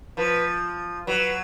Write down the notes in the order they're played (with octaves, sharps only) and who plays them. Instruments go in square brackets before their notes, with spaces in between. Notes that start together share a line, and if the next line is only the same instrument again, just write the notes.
[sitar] F3 [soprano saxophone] B4
[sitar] F#3 [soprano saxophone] B4